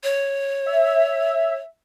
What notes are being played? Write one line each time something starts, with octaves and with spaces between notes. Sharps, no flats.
C#5
E5